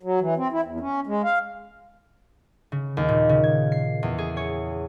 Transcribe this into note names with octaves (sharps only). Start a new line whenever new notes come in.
F#3
E3
C4
E4
E2
C#4
G#3
F5
C#3
D#2
A#2
C#3
G#6
C7
E2
G#4
C#5